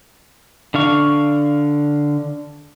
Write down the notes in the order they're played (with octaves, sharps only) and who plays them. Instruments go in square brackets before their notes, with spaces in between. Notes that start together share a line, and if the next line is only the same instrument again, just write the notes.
[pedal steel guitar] D3 D4 F5 C#6